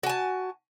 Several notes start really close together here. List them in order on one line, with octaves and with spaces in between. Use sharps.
F#4 G#5 A5